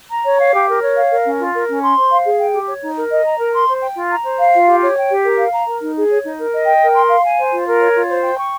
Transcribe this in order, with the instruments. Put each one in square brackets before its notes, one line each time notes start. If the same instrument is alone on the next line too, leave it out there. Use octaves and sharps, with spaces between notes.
[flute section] A#5
C#5
F5
G4
A#4
C#5
F5
A#4
C#4
F4
A#4
C#4
C6
C5
F5
G#4
G5
G4
C#5
D#4
A#4
D#5
A#5
A#4
C6
C5
G5
F4
A#5
C5
F5
F4
G4
C#5
G5
G4
A#4
F5
A#5
A#4
D#4
G#4
C#5
D#4
A#4
D#5
G5
A#4
C6
F5
G#5
C5
F4
A#4
C#5
F4
C5
G5
C#6